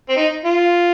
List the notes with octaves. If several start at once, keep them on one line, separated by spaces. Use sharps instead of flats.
C4
D#4
F4